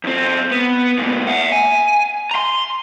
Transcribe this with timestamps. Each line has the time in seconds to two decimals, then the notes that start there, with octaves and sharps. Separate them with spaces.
0.04 E2 C4
0.51 B3
0.98 C#2 A#2
1.27 E5 F#5
1.52 G#5
2.31 A#5 C6